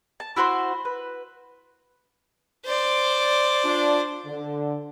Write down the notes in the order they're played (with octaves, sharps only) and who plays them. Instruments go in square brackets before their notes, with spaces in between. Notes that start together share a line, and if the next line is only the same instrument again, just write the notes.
[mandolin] A5
E4 F#4 C5 C6
B4
[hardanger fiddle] C5 D5
[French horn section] D4 F4
D3